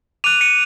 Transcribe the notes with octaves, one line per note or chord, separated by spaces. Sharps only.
D6 F#6 D#7 F7
C#7 D#7